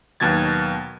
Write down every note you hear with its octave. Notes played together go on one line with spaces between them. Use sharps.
D#2 B2 F#3 G#6 A6